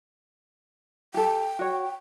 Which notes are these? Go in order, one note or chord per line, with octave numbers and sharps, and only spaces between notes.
G4 A4 G5
F#4 C#5